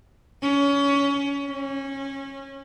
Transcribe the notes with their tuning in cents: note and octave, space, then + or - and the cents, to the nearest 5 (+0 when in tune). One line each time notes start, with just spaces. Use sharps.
C#4 +25
C#4 -20